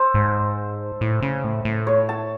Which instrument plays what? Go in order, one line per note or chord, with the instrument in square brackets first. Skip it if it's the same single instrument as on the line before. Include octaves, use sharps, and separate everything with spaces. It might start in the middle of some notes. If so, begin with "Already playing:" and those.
Already playing: [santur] A4 C5
[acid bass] G#2
A2
C#3
A2
A2
[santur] C#5
A5